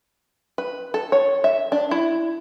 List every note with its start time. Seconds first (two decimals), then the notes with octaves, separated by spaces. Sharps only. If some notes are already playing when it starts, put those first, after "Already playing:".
0.58 B4
0.94 A4
1.12 C#5
1.44 E5
1.72 D4
1.91 E4